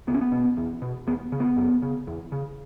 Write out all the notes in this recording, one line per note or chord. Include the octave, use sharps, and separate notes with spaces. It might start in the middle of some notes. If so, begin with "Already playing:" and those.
C#2 B3
C#4
B3
B2
E2
B2
D#2 B3
C#3
B3
F#2
C#3
E2
C#3